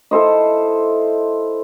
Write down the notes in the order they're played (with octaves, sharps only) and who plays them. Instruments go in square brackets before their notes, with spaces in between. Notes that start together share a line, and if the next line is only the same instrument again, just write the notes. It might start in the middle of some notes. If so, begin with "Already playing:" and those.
[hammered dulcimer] E4 A4 C5 D#5